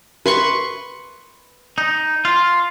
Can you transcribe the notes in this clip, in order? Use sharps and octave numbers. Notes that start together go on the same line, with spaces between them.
B4 C6 C#6
D#4
F4